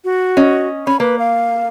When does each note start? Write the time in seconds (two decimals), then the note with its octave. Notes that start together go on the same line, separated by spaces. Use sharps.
0.04 F#4
0.37 C#4 D#5
0.87 C#4 B5
1.00 A#3 B4
1.19 F5